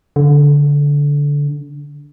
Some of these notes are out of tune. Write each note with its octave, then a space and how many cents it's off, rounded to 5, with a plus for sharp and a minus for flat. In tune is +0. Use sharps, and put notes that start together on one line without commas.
D3 -20